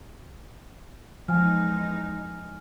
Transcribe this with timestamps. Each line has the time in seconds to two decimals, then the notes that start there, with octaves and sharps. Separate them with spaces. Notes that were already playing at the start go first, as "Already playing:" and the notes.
1.28 E2 F3 G#3 D#4 G#5 F6